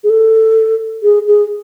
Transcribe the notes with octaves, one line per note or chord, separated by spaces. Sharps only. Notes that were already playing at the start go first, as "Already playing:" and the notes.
G#4
A4
G#4
G#4